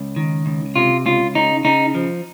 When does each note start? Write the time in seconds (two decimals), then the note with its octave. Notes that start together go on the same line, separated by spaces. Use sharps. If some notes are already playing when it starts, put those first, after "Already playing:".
Already playing: C#2
0.16 D#3
0.46 C#2
0.76 C3 F4
1.06 C#2 F4
1.35 C#3 D#4
1.65 C#3 D#4
1.95 F3